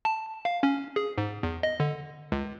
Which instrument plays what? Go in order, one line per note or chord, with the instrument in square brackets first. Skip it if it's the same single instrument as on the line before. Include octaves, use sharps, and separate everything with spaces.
[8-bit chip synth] A5
F5
C#4
G#4
G#2
E2
D#5
D3
C#2